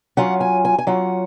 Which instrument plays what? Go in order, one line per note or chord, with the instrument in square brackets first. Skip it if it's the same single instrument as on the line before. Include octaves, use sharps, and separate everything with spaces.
[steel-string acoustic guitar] F#3 C#4 F4 F#5
G#5
G#5
G#5
F#3 C#4 F4 F#5